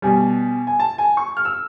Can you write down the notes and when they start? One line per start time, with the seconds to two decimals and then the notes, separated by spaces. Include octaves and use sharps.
0.02 B2 G3 G#5
0.67 G#5
0.80 A5
0.98 G#5
1.17 C#6
1.37 F6
1.45 E6